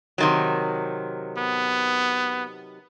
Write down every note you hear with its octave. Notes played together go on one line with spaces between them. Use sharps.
C3 D#3 F#3
B3